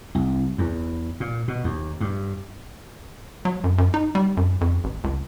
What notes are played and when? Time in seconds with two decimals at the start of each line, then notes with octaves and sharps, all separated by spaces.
0.15 C2
0.58 E2
1.20 A#2
1.48 B2
1.64 D#2
2.01 G2
3.45 F#3
3.64 F#2
3.78 F#2
3.94 D#4
4.15 G3
4.37 F#2
4.61 F2
4.84 A1
5.04 C#2